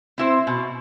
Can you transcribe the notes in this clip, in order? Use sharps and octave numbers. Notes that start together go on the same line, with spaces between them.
C4 E4 C5
B2